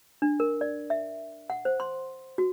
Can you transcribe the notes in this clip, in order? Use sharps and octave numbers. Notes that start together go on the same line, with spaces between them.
D4
A#4
D5
E5
F#5
C5
C6
F#4